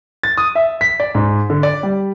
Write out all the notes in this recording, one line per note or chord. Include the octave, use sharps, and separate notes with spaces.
A6
D#6
E5
B6
D5
G#2
D3
D5
G3